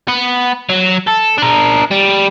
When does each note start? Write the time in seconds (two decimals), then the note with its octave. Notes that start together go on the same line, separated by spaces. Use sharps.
0.09 B3
0.69 F#3
1.07 A4
1.38 D4 A#4
1.91 G3